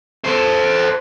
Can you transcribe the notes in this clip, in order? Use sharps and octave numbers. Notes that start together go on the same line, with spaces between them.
A4 C5